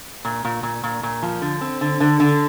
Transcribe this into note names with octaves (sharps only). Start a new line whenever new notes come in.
A#2
A#2
A#2
A#2
A#2
F3
D3
C4
D3
D3
D3